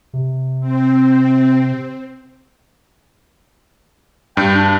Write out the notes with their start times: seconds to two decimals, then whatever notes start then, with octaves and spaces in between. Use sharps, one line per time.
0.13 C3
0.60 C4
4.37 G2 G5
4.55 D4